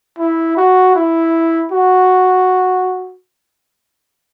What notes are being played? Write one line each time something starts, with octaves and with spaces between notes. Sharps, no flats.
E4
F#4
E4
F#4